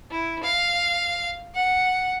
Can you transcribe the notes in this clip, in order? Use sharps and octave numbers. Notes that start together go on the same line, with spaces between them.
E4
F5
F#5